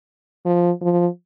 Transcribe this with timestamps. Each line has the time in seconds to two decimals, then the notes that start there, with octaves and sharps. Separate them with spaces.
0.45 F3
0.81 F3